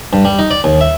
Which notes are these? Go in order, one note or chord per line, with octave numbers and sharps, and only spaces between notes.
G2
G3
D#4
D5
D#2
E5